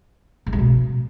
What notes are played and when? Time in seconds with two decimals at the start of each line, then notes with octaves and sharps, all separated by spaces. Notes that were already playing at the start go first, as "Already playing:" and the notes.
0.46 G#2
0.53 G#3
0.59 B2